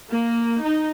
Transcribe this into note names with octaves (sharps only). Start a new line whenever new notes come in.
A#3
D#4